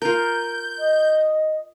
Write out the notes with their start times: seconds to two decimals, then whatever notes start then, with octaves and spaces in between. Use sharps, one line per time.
0.02 F4 A#4 G6
0.79 D#5